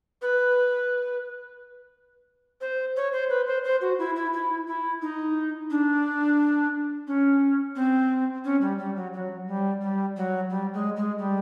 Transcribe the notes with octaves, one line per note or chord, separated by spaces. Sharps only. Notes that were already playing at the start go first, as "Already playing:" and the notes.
B4
C5
C#5
C5
B4
C5
C5
F#4
E4
E4
E4
E4
D#4
D4
C#4
C4
C#4
G3
G3
F#3
F#3
G3
G3
F#3
G3
G#3
G#3
G3